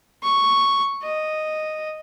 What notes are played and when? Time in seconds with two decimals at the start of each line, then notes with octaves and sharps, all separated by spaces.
0.23 C#6
1.03 D#5